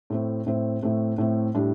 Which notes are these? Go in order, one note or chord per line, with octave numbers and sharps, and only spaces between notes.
A2 A3 C4
A2 A3 C4
A2 A3 C4
A2 A3 C4
A2 G3 D4